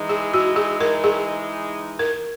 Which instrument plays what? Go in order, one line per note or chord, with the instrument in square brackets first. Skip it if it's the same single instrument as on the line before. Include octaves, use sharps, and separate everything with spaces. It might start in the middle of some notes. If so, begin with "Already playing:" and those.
Already playing: [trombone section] E3 G#3 D#4
[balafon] G#4
F#4
G#4
A#4
G#4
A#4